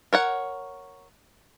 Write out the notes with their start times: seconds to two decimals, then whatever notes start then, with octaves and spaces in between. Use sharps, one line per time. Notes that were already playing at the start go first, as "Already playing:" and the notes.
0.13 A#4 C#5 F#5